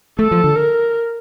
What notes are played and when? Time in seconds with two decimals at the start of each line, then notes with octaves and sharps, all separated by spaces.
0.19 A3 A4
0.31 F3
0.44 D3
0.56 A#4